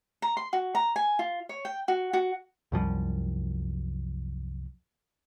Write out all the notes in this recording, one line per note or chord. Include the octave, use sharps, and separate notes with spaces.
A#5
C6
F#4
A#5
G#5
F4
C#5
G5
F#4
F#4
C2 F#2 F3 G3